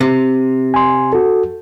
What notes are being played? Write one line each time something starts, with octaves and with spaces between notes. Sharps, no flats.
C3
G#5 C6
F#4 A4